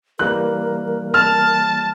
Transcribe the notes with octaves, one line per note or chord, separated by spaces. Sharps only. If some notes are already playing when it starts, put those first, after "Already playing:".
E3 G3 A#3 A#4 F#6
A5 F6